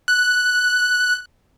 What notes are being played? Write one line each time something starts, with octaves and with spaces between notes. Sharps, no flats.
F#6